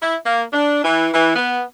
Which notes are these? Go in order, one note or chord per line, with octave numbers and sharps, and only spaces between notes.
E4
A#3
D4
E3
E3
B3